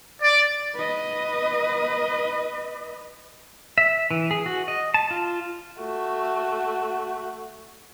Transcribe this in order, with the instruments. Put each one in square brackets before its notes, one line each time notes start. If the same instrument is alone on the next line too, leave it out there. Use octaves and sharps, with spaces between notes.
[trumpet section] D5
[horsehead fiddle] B4 D#5
[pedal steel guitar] E5
E3
G#4
F#4
D#5
A5
F4
[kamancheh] A3 F#4